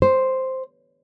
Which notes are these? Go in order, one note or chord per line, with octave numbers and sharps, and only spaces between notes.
C5